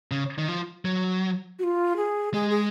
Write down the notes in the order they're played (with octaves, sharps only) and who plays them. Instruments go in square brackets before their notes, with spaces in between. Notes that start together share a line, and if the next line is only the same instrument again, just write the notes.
[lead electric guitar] C#3
D#3
F3
F#3
[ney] F#4
F4
G#4
[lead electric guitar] G#3 [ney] G#4
[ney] G#4